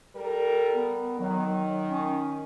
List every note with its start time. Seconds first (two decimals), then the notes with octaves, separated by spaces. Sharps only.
0.16 G3 A4 A#4
0.74 B3
1.20 D#3 F#3
1.89 C#4